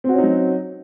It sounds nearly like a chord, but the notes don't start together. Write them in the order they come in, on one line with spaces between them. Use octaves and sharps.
C4 F#4 C#4 D#4 F#3